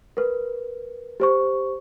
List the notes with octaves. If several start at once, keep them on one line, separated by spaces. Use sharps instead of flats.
A#4 B4
G4 C5 C#6